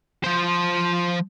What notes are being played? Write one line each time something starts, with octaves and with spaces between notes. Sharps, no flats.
F3 C5